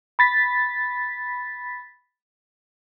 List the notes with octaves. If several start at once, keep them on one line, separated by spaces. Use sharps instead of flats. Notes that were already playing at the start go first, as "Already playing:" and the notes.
B5 A6 B6